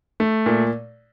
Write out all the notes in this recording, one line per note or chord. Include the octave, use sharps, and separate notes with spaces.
A3
A#2